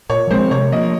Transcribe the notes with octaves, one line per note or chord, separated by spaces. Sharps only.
A#2 C#5
F3 G#3 C4 C5
C3 C#5
F3 A#3 D#5